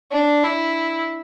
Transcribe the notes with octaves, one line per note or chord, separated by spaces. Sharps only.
D4
E4